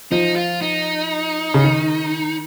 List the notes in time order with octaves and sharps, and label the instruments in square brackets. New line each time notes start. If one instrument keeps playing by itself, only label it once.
[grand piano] F3 [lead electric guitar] D#4
[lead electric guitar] F4
D#4
[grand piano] C#3
D#3